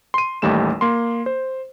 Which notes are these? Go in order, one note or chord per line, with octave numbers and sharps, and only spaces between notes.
C6 D#7
A1 D#2 G3 A3 E7
A#3 C6
C5